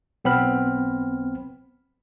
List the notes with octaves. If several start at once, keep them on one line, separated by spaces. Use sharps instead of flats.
B1 B3 C4 B5 F6